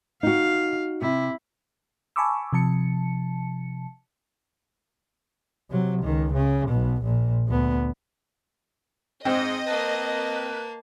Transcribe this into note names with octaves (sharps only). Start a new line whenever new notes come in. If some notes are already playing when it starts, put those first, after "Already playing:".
D#4 F#4 F5
C3 E4
G#5 A5 B5 C#6 D6 E6
C3 F3 A5 C#7
C3 F#3
C#2 D#3
C#3
B1 B2
A#1 A#2
D2 B3
G#2 C4 D#5
A#3 A#4 B4 A5